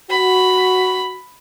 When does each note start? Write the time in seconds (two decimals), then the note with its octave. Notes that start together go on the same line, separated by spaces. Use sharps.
0.10 F#4 B5